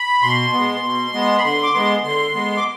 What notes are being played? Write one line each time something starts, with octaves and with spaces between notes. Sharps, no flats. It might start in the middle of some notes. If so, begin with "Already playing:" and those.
Already playing: B5
B2 C6
G#3 B3
B2
G#3 B3
B5
D3 C6
D6
G#3 B3 C6
D3 C6
G#3 B3
D6